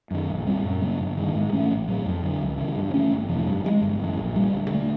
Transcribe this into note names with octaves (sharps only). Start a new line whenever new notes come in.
F#2 D#3
A#1
A#2 G3 C4
F#2
C#3 F#3 A#3
G1
G2 D#3
G#2
E3 A3 C#4
A1
A2 F#3
F2
D3 F#3
C#2
C#3 E3
G2
E3 A3 C#4
G1
F2 C3 E3
G2
E3
G#3
G1
F#2 C#3 E3
A#1
A#2 G3
D2
D3 F#3 A3